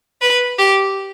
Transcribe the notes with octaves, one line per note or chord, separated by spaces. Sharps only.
B4
G4